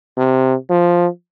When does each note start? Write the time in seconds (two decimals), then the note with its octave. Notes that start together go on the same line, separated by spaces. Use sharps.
0.17 C3
0.70 F3